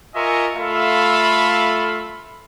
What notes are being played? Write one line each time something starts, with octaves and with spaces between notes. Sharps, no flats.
F4 A#4 D#5 E5 G#5 C#6
A3 F4 A4 E5 F5 B5